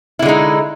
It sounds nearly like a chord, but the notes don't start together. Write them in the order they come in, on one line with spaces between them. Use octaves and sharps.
E4 D3 G#3 D#4